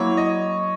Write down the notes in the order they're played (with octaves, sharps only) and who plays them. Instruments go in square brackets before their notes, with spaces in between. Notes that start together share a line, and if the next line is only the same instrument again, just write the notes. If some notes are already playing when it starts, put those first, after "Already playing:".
Already playing: [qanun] F#3 A#3 E4 [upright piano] C#5
[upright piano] D#5